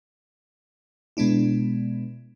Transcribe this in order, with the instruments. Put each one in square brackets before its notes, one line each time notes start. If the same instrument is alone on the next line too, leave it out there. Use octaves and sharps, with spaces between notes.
[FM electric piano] B2 G#3 B3 D4 E4